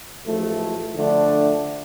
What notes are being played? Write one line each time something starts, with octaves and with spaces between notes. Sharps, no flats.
A1 G#2 F3 A3
D3 F3 A3 D4